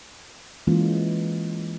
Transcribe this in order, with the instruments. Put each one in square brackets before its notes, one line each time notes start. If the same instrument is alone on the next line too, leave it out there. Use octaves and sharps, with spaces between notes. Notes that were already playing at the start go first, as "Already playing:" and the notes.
[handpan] E3 G#3 A#3 C#4 F4